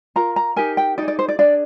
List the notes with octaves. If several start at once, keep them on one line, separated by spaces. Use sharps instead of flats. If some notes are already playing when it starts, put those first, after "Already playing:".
F4 A#4 A#5
A#5
D#4 G4 A#4 G#5
G5
D#4 G#4 D5
D5
C5
D5
D4 G#4 D5